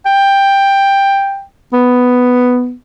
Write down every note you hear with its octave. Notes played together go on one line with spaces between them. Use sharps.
G5
B3